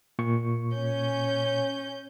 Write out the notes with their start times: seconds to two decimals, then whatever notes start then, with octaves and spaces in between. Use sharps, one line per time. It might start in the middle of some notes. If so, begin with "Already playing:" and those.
0.19 A#2 C#6
0.74 C#4 G6